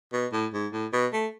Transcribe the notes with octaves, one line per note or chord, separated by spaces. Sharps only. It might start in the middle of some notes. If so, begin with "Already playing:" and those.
B2
A2
G#2
A2
B2
A3